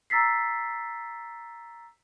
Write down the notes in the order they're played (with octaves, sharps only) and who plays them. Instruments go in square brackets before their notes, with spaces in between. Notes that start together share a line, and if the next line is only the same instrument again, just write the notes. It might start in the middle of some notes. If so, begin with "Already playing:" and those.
[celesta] A#5 E6 A6 B6 C7